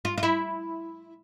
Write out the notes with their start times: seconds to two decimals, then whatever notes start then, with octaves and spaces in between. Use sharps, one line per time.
0.05 F4
0.18 F4
0.23 E4